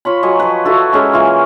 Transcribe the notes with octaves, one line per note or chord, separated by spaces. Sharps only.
F4 C#5 B5
F#3 D#5 G#5 C#6
F3 B4
E4 F#4 A4
G#3 C#4 G#4 A#4
E3 A#3 F4